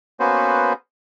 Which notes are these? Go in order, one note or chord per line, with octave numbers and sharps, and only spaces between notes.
A#3 B3 C#4 F#4 B4 C5